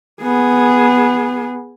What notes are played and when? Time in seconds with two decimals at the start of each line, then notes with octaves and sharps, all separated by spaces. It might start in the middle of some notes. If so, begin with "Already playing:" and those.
0.22 B3 G#4